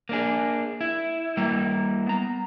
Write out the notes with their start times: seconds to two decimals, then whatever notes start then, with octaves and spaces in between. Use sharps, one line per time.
0.09 A#3 D4 G#4
0.81 E4
1.37 G3 A#3 E4
2.06 B3 A#5